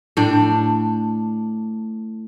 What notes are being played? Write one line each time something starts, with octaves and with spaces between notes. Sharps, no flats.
A2 D4